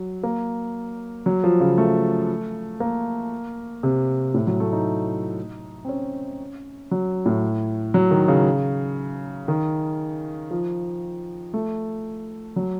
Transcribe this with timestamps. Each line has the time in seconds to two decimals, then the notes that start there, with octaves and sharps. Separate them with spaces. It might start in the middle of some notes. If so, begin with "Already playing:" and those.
Already playing: F#3
0.23 A#3
1.26 F#3
1.44 F3
1.60 C#3
1.78 A3
2.80 A#3
3.83 C3
4.34 A2
4.47 F#3
4.60 A3
4.73 D#4
5.85 C4
5.89 C#4
6.91 F#3
7.26 A2
7.94 F#3
8.11 D#3
8.28 C#3
9.48 D#3
10.51 F3
11.54 A3
12.56 F#3